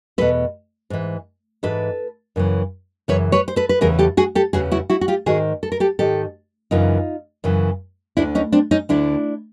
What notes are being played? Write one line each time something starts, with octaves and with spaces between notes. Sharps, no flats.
E2 B2 A4 B4
G#2 E3
G#2 E3 A4 B4
F#2 C#3 E3
F#2 C#3 E3 B4 C#5
B4 C#5
C5
A4 B4
B4
E2 C#3 E3 G#4 A#4
G4 A4
F#4 G#4
G4 A4
E2 C#3 E3 F#4 G#4
E4 F#4
E4 F#4
F#4
F4 G4
G#2 D#3 F#4 G#4
A4
A#4
G4 A4
G#2 D#3 G4 A4
F#2 C#3 E3 D#4 F4
F#2 C#3 E3
D2 D3 D4 E4
C#4 D#4
C4 D4
C#4 D#4
D2 D3 D4 E4